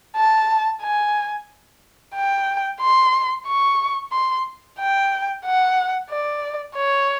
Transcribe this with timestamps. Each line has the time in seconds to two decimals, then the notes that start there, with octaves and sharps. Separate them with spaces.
0.16 A5
0.82 G#5
2.15 G5
2.81 C6
3.47 C#6
4.12 C6
4.79 G5
5.45 F#5
6.10 D5
6.76 C#5